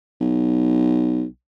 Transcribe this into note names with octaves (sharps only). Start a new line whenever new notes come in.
B1